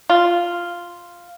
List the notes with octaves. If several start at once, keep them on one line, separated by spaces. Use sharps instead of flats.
F4